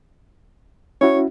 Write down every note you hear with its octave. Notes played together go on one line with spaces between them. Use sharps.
C#4 E4 F#4 C#5